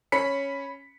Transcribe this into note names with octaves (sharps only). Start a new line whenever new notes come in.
C#4 B5 B6 C#7